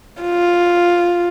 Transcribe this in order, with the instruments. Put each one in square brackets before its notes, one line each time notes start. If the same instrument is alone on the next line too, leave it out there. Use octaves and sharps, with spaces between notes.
[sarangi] F4